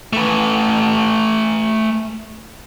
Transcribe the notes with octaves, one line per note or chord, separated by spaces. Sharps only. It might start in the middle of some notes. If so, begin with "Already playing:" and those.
A3 B4